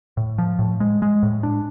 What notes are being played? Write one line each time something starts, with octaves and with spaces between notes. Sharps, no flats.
A2
F3
A2
G#3
G#3
A2
D4